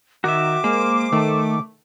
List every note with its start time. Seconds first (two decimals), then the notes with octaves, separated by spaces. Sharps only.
0.24 D#3 F#4 E5 D6
0.64 G#3 A#3 C5
1.12 D#3 A3 A5